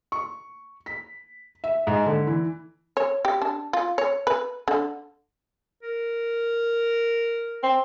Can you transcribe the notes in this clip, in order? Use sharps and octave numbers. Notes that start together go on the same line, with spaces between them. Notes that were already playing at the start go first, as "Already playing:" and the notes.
C#6
B6
E5
G#2
D3
E3
C#5
G4
D4
F4
C#5
B4
D3
A#4
C4